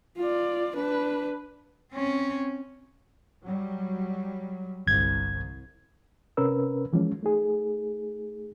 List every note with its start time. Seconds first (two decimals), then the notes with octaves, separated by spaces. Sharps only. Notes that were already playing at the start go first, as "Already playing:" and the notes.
0.17 F4 D5
0.76 D4 B4
1.93 C4 C#4
3.44 F#3 G3
4.87 G1 C2 G#6
6.37 C3 C#4 A#4 B4 E6
6.93 E3 F3 G#3 C#4
7.23 A3 D#4 G#4